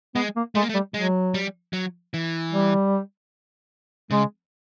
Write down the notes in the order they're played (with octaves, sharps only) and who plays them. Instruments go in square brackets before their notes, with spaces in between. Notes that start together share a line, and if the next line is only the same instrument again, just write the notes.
[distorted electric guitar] G#3 [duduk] B3
[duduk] A#3
[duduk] G#3 [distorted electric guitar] A3
[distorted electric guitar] A#3
A3
[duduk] G3
[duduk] F#3 [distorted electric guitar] G#3
[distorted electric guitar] G3
F#3
E3
[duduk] G3
[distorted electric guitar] C#3 [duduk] G#3